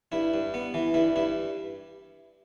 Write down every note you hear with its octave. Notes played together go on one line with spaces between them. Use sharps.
G2 E4
G2
B3
E3
G2 E4
G2 E4